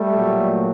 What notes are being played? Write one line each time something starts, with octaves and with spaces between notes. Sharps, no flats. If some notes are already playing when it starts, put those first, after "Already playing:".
Already playing: G3 A3
A#2 F#3